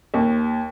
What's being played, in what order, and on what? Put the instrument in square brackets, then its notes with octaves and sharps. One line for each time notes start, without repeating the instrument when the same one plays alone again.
[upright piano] D#2